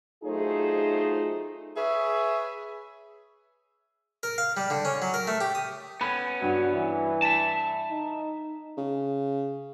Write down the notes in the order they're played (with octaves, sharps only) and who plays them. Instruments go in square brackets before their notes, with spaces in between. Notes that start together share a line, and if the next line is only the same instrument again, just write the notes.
[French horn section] F#3 A3 D#4 F4 G#4 C5
[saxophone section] G#4 B4 C#5 E5
[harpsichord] A#4
F5
G3
D3
C#4
F#3
A#4
A3
G4
D#6
[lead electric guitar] B3 C#4 [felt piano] B5
[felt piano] G2 [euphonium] F#4
[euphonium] E3
[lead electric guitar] E5 A5
[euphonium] D#4
[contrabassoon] C#3